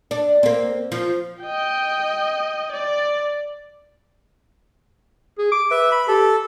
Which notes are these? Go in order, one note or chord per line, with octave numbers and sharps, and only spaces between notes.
D4
A#3 C4
F3
D#5 G5
D5
G#4
D6
B4 E5
B5
G4 A4